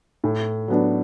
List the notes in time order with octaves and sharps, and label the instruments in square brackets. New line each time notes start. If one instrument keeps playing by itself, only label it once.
[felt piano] A2
F#3 B3 D4